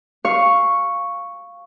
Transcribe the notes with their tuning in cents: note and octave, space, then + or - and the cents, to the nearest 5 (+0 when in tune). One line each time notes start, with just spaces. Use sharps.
F5 +0 C#6 +0